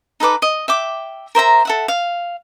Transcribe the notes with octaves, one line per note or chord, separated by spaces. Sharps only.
D#4 A4 B4 D6
D#5
E5 G5 D6
A#4 C5 E5 A#5
A4 E5 F#5
F5